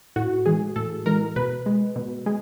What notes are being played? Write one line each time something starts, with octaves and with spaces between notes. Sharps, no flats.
A2 F#4
E3 G#3 G#4
A2 A4
E3 G#3 A#4
B2 B4
G#3
B2
G#3